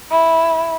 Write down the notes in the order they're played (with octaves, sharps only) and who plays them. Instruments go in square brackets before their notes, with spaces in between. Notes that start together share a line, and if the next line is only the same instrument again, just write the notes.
[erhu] E4